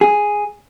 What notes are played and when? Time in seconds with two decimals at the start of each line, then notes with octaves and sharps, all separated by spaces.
0.01 G#4